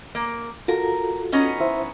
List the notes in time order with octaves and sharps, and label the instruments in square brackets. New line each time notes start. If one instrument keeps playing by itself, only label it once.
[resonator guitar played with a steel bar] A#3
[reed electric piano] F4 F#4 A4 [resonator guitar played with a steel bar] A#4
[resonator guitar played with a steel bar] B3 C#4 D#4
[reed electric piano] E4 C5 E5